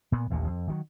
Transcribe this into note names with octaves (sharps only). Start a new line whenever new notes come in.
A#2 B3
A1 D#2 A#2
F2
D#3 E3 F#3